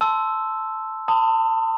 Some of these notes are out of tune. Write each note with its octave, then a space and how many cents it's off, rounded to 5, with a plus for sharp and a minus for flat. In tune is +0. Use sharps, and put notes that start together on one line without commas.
A5 +0 C6 -5 E6 +0
A5 +30 C6 -45 D#6 +0